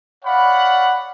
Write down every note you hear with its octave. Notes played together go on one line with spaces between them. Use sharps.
C#5 D5 F5 F#5 B5